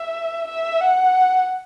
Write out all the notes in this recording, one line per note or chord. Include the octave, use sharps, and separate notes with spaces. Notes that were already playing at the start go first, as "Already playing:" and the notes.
Already playing: E5
E5
F#5